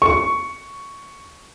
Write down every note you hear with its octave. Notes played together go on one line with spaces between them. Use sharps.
C#6